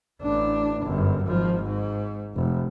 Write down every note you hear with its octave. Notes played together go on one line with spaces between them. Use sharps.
A1 D4
G1 F#2
G#1 F3
G#2
F1